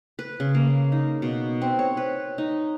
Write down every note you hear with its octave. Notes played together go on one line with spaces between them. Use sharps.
B4
C#3
A#3
D#4
B2
C4
C#5
B4
D#4